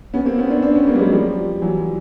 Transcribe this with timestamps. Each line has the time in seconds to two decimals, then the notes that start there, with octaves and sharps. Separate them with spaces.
0.14 B3 C#4
0.25 A#3 C4
0.38 B3 C#4
0.50 C4 D4
0.62 C4 D4
0.75 B3 C#4
0.87 A#3 C4
0.94 G3
0.99 F#3 G#3
1.12 F3 G3
1.62 E3 F#3